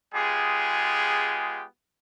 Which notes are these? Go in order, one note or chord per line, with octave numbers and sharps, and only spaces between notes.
G#3 B3 F4 G4 G#4